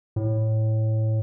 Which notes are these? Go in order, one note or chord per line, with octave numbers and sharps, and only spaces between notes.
A2